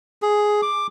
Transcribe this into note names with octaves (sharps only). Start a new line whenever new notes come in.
G#4
D6